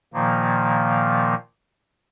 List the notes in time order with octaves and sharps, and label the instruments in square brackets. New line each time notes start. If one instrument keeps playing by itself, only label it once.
[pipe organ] A#2 D#3 F3 A#3